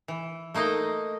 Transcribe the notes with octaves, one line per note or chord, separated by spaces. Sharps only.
E3
A3 A#3 D#4 D#5